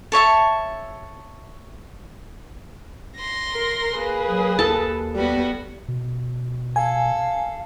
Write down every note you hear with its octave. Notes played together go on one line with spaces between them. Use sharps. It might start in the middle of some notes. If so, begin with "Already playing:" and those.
A4 C#5 E5 A5
C6 A#6
A#4
A#3 G#4 B4
F#3
D#2 A4 A5
G3 B3 F#4 B4
B2
A4 F5 G#5